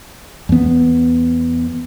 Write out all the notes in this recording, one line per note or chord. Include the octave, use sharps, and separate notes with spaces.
E2 B3